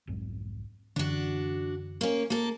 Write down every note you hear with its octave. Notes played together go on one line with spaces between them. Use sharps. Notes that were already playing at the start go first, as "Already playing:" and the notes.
B1 F2 G#2
F#2 D3 E3 D4 F#4
A#3 C#4
A#3 A4